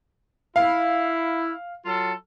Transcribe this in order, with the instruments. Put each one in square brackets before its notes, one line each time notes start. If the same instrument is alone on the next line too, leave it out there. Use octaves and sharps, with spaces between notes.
[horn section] E4 [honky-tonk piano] F5
[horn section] F#3 F4 A4